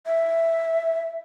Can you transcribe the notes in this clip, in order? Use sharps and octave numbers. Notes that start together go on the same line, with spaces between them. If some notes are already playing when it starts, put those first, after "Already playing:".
E5